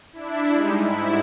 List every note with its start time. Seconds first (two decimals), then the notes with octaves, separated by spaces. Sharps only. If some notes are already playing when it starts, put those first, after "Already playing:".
0.13 D4 E4
0.51 G3 G#3 D#4
0.84 G#2 E4